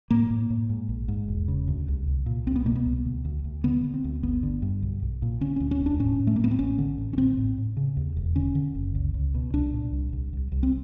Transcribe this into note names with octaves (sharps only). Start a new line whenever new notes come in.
A2 A#3
A2
A2
G#2
A#1
G#2
E1
C#3
D2
C2
C2
A#2
C2 C4
B3
B2 A#3
B3
C2
D2
D2
D2
D3 B3
D3
C4
D2
G1 B3
D3
G2
B1
B1
A#2
D3 C#4
D2 C#4
C#4
E1
D4
A2 C#4
A2
A3
A#3
A2 B3
C4
A1 C#4
D3
A1
C#4
A1 C4
A2
A2
C#3
D#2
E1
D3 C#4
D3
F#1
C#2
C#2
B2
C2 D4
A#2
C2
C2
C2
C2
C4